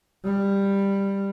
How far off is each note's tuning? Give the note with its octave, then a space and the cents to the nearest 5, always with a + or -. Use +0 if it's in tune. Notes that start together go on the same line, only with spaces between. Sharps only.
G3 +10